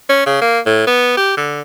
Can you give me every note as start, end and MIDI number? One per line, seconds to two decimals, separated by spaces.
0.09 0.22 61
0.26 0.39 49
0.41 0.59 58
0.66 0.84 45
0.87 1.17 59
1.17 1.36 67
1.37 1.61 50